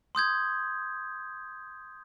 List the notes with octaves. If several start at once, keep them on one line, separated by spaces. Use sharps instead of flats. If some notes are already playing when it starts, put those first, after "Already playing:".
C6 D#6 G6 G#6